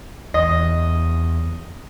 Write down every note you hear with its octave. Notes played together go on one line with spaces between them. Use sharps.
E2 D#5